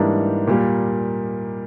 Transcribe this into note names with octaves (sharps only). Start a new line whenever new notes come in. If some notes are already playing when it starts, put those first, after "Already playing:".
Already playing: G#2 E3 G3 A#3 D4
A#2 G3 A#3